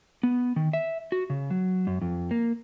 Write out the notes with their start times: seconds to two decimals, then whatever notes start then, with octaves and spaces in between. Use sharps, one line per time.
0.23 B3
0.56 D#3
0.73 E5
1.12 F#4
1.30 C#3
1.50 F#3
1.87 F#2
2.01 F2
2.31 A#3